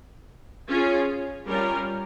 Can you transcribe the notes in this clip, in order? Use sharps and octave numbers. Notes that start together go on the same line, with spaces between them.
C#4 F4 G#4
G3 C#4 F4 A#4